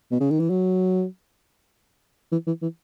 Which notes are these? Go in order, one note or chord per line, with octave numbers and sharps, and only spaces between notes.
B2
C#3
D#3
E3
F#3
E3
E3
E3